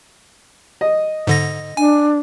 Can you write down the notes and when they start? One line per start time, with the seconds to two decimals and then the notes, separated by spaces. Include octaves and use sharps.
0.81 D#5
1.27 G#2 D3 A#6
1.77 D4 G#5